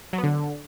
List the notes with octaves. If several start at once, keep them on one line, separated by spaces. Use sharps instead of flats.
F#3
B3
D3